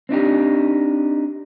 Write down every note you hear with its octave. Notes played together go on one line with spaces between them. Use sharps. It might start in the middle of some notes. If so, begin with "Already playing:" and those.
C4 D4 D#4 G4